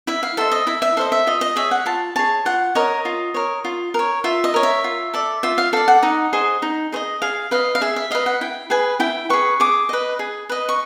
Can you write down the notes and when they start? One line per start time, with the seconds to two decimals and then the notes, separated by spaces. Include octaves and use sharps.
0.07 E4 E5
0.23 F5
0.37 A4 C5 D#5 E5
0.52 D#5
0.67 E4 E5
0.82 E5
0.97 A4 C5 D#5 F5
1.12 E5
1.27 F4 D#5
1.41 D#5
1.56 G#4 C#5 E5
1.71 F#5
1.86 F4 A5
2.16 G#4 C#5 A5
2.45 F4 F#5
2.75 A#4 C#5 D#5
3.05 F4
3.34 A#4 C#5
3.65 F4
3.94 A#4 C#5
4.24 F4 E5
4.44 D#5
4.54 A#4 C#5
4.63 E5
4.84 F4
5.14 A4 D5
5.43 F4 E5
5.58 F5
5.73 A4 D5 F5
5.88 F#5
6.03 D#4
6.33 G#4 C5 D#5
6.62 D#4
6.92 G#4 C5 D#5
7.22 G#4 F5
7.51 B4 D#5 F5
7.75 F5
7.81 G#4 E5
7.96 E5
8.11 B4 D#5 F5
8.26 F#5
8.41 E4 G5
8.70 G#4 B4 G#5
9.00 E4 G5
9.30 G#4 B4 C#6
9.60 G#4 D6
9.89 B4 D#5
10.19 G#4
10.49 B4 D#5
10.69 C#6